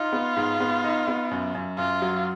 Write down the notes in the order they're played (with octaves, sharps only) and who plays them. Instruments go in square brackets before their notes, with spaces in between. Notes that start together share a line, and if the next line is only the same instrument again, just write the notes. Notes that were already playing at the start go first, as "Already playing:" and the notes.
Already playing: [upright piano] D#4 [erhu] F4
[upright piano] B3
G#2
B3
D#4
B3
F#2
F#2
[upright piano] F#2 [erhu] F4
[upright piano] F#3